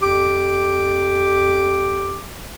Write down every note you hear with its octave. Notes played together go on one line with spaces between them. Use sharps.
F2 G4 D6